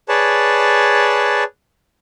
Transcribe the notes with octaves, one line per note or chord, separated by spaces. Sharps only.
G#4 B4 C#5 D5 A5